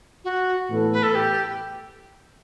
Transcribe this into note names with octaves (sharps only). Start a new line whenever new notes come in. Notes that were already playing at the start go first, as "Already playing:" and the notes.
F#4
A2 E3 B3 E4 A4
B4
A4
G4